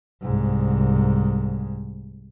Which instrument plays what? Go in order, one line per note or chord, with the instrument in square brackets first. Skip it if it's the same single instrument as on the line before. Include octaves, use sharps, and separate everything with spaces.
[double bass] C2 G#2